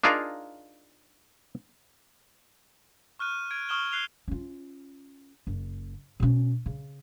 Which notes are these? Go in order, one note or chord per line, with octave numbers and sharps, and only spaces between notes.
D4 D#4 F4 G#4 A#4 F5
C#6 F6 F#6 D#7
G#6 D7
C#6 D#6 F6 E7 G7
F#6 C7 F7 G7
C#4 F4
F#1
B2 C#4
C#3